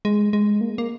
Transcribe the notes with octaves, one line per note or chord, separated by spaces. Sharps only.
G#3
G#3
A#3
A#3